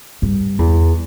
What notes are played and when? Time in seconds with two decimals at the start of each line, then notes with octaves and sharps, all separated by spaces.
0.22 G2
0.59 E2